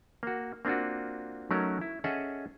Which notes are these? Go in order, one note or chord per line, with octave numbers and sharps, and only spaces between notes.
A#3 F#4
A#3 C4 D4 F4 F#4
F#3 A3 C#4 D#4 A#4
E4
C#4 G#4 A4 D#5 E5 F#5